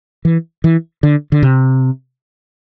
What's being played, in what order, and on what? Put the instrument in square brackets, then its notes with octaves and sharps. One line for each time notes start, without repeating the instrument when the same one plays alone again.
[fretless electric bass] E3
E3
D3
D3
C3